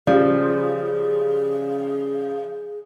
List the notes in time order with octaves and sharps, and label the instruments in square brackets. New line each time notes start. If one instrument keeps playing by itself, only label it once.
[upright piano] C#3 G3 [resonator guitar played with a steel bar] F3 [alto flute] G#4 [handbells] D5